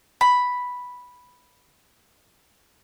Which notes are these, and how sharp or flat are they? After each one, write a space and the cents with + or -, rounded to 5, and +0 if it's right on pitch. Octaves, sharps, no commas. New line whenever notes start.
B5 +0